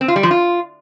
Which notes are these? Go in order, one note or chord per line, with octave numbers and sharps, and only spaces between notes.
C4
F4
G3
F3
F4